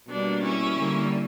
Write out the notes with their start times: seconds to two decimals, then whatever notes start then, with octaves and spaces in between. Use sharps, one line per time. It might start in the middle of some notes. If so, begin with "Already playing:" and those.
0.09 B2 G3 A#3 D4
0.42 C#4 E4
0.75 D3 G3 A#3